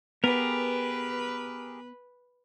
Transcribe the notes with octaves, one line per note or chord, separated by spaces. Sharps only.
B3 G4 G#4 A#4 B4